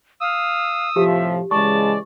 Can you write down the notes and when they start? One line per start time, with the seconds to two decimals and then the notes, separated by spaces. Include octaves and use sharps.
0.21 F5 D#6 E6
0.96 A2 C3 F3 G4 E5
1.51 C#3 E3 G#3 D5 A5 C#6